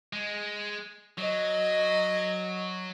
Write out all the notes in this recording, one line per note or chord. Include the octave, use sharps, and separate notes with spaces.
G#3
F#3 D#5